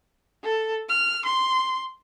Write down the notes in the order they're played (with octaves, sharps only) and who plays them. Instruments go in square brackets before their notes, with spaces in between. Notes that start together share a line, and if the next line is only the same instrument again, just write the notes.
[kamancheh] A4
F6
C6